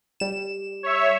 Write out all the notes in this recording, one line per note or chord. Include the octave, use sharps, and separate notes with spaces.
G3 E7
C#5 E5